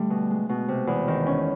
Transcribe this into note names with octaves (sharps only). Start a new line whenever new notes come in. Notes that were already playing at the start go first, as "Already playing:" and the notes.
Already playing: D3 G3 A3
B2
G#3
B2
C3
E2
D#3
C#4